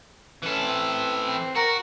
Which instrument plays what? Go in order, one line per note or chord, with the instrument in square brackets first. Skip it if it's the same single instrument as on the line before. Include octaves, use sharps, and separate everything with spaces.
[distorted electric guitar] E3 A4 [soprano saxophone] C#4
[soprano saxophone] C4
C4
[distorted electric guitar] F#4 [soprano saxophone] A#4